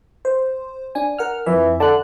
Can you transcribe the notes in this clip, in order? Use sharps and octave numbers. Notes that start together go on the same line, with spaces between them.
C5
D4 G#5
A#4 F#5 F6
F2 E3 E5
D3 A5 F#6